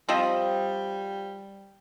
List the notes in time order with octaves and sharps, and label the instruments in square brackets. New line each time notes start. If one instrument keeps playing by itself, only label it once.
[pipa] F3 C4 D#5 [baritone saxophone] G3